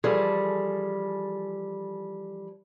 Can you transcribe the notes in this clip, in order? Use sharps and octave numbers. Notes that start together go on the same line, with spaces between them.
E3 F3 G3 G#4 A4